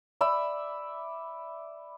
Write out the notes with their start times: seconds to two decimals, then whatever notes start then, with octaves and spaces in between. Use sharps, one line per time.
0.21 D5 E5 B5